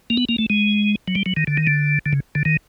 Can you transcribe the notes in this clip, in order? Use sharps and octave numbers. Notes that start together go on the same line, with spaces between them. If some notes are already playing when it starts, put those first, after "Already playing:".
A#3
B3
A#3
A3
G#3
F#3
G3
F#3
D#3
D3
D#3
D3
D3
C#3
D3
D#3